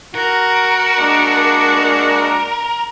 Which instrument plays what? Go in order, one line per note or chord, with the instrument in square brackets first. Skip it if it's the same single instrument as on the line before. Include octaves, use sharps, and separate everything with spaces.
[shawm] F#4 [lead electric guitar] A#4
[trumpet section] G#3 A#3 D4